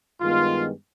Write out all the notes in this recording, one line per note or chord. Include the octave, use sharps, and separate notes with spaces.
G2 D#3 G#3 B3 F4